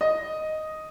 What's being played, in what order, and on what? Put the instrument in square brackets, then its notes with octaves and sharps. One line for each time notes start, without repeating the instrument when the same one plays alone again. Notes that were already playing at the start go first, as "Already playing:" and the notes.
[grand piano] D#5